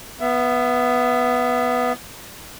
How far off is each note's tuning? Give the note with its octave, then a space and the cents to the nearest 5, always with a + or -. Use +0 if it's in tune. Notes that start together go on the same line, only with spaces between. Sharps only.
B3 +0 E5 +25